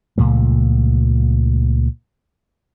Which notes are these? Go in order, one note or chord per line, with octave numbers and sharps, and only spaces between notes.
C#2 A#2 F3 A3